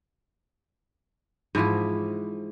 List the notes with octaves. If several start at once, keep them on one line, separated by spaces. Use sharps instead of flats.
G#2 E3 F3 E4